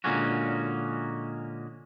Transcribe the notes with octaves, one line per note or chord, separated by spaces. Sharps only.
A#2 D3 G#3 A#3 C#4 F#4